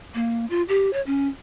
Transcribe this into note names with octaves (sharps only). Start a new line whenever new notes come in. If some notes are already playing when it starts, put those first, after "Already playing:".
A#3
F4
G4
C#5
C#4